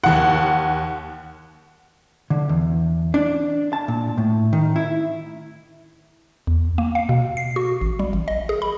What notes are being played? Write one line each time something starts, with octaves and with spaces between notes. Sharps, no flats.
D#2 F#5
D3
E2
D4
A5
A#2
A2
D#3
E4
E2
A#3
F5
B2
C7
F#4
A1
G3
A1
D#5
G#4
B5